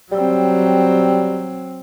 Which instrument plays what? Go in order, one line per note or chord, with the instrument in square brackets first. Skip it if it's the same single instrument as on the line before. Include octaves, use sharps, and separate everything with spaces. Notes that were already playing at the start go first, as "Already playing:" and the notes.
[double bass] F#3 C4 [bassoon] G3